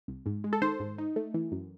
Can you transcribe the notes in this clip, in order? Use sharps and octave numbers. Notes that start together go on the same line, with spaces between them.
C2
G#2
G#3
A4
D#3 C5
G#2
D#4
A3
E3
F#2